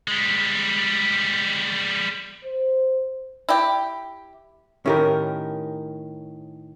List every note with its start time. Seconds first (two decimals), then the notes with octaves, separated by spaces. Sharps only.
0.08 G3 G#3
2.45 C5
3.49 E4 G4
4.86 A2 D#3 C#4 G4 A#4